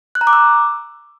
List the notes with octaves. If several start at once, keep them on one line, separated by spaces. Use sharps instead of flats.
F#6
A#5
D6
E6